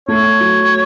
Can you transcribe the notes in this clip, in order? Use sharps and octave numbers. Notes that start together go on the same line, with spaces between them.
A3 C#5
F#3